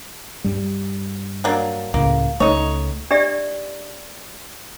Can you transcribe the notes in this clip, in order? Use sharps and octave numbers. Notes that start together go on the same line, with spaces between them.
G2 G3
F#3 A#3 D4
C#2 A2 C#3 A#3
C#2 A3 D#4 C#5
D4 G4 D5 E5